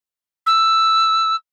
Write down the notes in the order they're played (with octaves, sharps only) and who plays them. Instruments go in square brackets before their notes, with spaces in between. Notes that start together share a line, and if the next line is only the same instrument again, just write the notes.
[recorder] E6